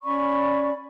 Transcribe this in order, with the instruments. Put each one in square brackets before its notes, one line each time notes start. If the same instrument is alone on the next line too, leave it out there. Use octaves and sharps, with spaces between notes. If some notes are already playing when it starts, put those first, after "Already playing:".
[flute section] C#4 D5 B5 C#6